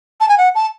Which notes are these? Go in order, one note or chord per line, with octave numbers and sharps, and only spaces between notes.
A5
G#5
F#5
A5